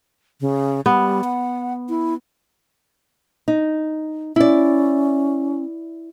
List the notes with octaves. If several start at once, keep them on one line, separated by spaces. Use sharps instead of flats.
C#3
G3 B3
F#5
E4
D#4
C#4 E4 D5